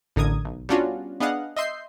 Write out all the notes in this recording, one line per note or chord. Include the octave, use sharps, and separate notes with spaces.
A1 D3 A#4 D#6 G#6
B1
G3 B3 C#4 D4 F4 F#4
B3 D4 G#4 D#5 F5 F#5
D#5 E5 C6 G6 C7